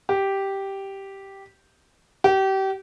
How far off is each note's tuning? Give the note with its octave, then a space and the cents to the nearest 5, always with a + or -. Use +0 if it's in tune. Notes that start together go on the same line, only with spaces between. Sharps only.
G4 -5
G4 -30